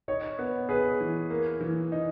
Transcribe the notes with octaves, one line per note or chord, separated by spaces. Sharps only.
D#4 C#5
B3
G#4 B4
E3
A#3
E3
D#4